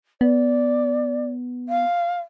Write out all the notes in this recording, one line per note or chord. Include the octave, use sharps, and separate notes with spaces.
B3 D5
F5